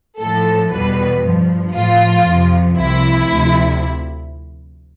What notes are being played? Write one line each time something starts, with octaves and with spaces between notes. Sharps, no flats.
A2 F3 A4
E2 B2 G3 B4
G2 F3
A2 F3 F4
F2 C3 F3
C2 C3 F3 E4
D2 C3 F3